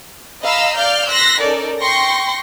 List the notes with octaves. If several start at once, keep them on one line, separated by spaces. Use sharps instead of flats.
D#5 F5 A#5 B5 E6
D5 F5 F6 G6
C6 E6 F#6 A#6 B6
C#4 D#4 A4 A#4 D5
G5 C6 C#6 A#6